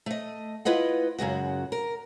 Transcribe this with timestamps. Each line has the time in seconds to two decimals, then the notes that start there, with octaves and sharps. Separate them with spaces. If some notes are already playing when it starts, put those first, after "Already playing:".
0.06 A3 D#5
0.65 E4 F4 B4 D#5 F#5
1.18 F#2 C#3 G#3 F#4
1.72 A#4